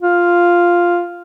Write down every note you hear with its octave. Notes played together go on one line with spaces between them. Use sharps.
F4